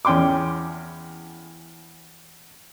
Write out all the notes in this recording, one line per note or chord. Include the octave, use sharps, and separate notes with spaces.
E2 C#4 G5 C6 D6